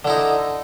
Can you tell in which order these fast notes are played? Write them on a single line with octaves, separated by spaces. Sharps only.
D3 E4 D#4